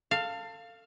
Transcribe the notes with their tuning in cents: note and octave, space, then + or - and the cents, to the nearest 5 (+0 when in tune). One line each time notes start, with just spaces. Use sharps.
A4 +30 F5 +0